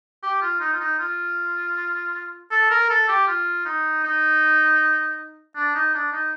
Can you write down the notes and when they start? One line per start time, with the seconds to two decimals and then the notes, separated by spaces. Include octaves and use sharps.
0.23 G4
0.42 F4
0.61 D#4
0.73 F4
0.80 D#4
0.99 F4
2.51 A4
2.70 A#4
2.90 A4
3.08 G4
3.27 F4
3.65 D#4
4.04 D#4
5.56 D4
5.75 D#4
5.94 D4
6.13 D#4